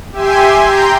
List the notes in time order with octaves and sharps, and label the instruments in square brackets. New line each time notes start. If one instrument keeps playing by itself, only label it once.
[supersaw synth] G4 E5 G#5 C6
G5 A#5 C6 G6